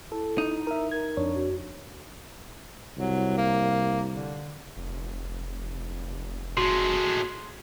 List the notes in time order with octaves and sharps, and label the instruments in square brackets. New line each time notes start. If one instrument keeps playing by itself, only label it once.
[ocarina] E4 [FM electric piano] A4
[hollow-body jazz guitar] D#4
[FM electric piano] A#4 E5
[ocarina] A#4 [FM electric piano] G#6
[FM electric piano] F2 D4 C#5
[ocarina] F#4
[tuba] C2 [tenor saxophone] F#3
[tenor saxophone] A#3
D3
[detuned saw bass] F1
[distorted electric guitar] A2 G#3 [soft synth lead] F#4 [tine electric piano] C6